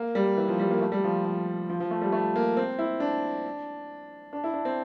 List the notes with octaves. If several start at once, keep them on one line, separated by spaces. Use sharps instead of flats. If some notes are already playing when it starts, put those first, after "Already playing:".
Already playing: A#3
G3
E3
F3
G3
A#3
A3
G3
F3
F3
F3
F3
A3
G3
A3
A#3
C4
E4
D4
D4
E4
D4
C4